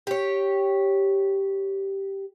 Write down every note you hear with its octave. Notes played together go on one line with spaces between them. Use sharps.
G4 C#5